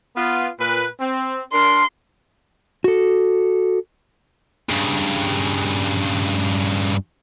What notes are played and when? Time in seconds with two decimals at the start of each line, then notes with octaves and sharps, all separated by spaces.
0.16 B3 F4
0.59 A#2 B4
1.00 C4
1.53 D4 A#4 C6
2.84 F#4 A4
4.69 G2 C#3